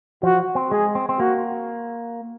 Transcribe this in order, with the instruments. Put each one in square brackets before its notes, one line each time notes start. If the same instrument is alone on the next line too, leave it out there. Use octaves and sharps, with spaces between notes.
[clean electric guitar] F3 [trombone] F#4
[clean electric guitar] C4
[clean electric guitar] G#3 [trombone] G#4
[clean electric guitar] C4
C4
[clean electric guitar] A#3 [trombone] F#4